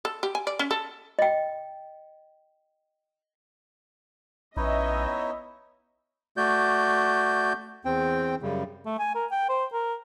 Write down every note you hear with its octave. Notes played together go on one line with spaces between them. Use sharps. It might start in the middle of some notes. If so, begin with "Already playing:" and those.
A4
G4
G#5
D5
C#4
A4
D#5 G5
A#1 B3 C#4 D#4 E4 C#5 D#5 E5
A3 F#4 D5 G6
E2 C4 G5
F#2 C#3 G3
A3
G#5
A#4
G5
C5
A#4